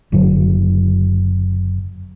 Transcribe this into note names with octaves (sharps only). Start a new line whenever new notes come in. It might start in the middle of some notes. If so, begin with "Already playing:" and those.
F#1 F#2 D3 F#3